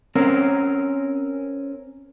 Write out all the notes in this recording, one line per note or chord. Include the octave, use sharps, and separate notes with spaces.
C4 C#4 A#4